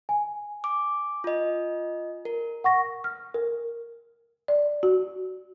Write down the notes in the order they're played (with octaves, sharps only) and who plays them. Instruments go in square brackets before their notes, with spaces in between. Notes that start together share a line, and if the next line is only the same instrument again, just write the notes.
[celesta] G#5
[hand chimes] D6
F4 D#5
A#4
[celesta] F#5 C#6 A#6
[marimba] F6
A#4
D5
F#4